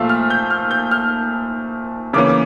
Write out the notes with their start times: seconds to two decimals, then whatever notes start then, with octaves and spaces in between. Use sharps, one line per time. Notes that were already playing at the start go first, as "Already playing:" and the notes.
Already playing: A#2 F3 A3 F5 E6
0.09 F6
0.30 G6
0.50 F6
0.71 G6
0.91 F6
2.13 C#3 E3 A#3 C#4 D6
2.29 D6